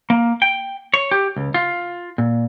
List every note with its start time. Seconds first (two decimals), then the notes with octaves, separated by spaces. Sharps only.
0.10 A#3
0.42 G5
0.94 C#5
1.11 G4
1.37 C#2
1.54 F4
2.18 A#2